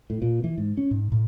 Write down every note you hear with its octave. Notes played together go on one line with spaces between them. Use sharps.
A2
A#2
E3
G#2
C#4
G#2
A2